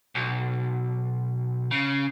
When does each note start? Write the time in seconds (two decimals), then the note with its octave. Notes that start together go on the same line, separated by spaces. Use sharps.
0.15 B1
1.71 C#3